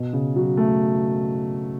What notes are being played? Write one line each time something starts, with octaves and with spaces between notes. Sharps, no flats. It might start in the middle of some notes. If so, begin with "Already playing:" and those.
Already playing: B2
C#3
F#3
A3